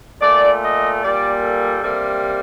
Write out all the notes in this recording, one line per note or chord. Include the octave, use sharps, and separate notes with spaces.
A#2 A3 D5
D#5
A#2 G3 A#3 D5
A4
C3 G3 A#3